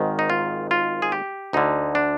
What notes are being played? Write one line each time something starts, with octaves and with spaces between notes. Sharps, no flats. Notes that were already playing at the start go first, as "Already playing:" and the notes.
Already playing: G#1 G#2 D#3
D#4
F4
F4
G#4
G4
D2 D3 D#4
D4